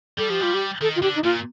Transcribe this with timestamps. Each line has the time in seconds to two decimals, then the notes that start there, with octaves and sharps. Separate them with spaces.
0.18 G3 A4
0.29 F3 G4
0.40 G3 F4
0.54 G4
0.81 D#3 A4
0.96 F4
1.02 D3 G4
1.15 D#4
1.24 A#2 F4